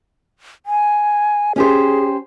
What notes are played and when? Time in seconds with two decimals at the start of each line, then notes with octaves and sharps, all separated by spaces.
0.66 G#5
1.56 C#4 G4 G#4 C5